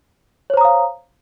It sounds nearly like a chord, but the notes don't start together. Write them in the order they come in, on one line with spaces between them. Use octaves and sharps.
C#5 C5 A#5 D#6 F5